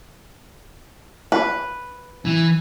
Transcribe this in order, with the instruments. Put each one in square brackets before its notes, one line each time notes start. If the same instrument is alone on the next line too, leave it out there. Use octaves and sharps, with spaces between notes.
[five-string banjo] B4
[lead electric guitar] E3